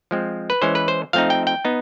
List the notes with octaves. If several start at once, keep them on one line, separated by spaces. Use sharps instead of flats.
F3 G#3 C4
B4
E3 G#3 C#4 C5
B4
C5
F3 A3 C4 D#4 F5
G5
G5
B3 D#4